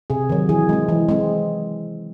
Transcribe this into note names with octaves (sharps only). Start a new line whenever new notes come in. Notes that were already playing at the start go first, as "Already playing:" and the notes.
C3 G#4
D#3 F#3
E3 G#4
G#3 C4
E3
G#3 C4